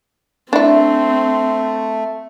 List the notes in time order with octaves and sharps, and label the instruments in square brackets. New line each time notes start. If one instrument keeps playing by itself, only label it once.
[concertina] A3 [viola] C4 [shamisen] D4 E4